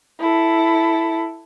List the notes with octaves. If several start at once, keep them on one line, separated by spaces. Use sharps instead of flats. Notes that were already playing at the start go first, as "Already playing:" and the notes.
E4 A4